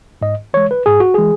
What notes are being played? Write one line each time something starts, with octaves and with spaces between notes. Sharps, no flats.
G#2 D#5
E3 G#3 C#5
B4
G#2 G#4
F#4
E3 G#3 G#4